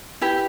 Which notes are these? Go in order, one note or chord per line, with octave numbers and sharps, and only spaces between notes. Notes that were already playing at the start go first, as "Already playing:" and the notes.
E4 G4 B4